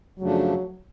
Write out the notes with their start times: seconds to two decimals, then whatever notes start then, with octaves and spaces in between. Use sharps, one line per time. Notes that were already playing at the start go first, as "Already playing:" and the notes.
0.19 F#2 C#3 F3 F#3 A3 D4